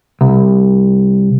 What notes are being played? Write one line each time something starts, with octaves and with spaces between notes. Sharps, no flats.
C2